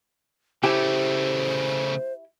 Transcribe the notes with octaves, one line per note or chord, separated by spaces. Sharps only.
C#3 A3 E4 G4 C5